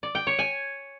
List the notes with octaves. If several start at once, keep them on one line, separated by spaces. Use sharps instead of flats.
D5
G5
C#5
G#5